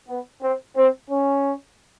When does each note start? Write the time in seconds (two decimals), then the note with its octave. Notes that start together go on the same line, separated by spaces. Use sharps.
0.09 B3
0.42 C4
0.77 C4
1.11 C#4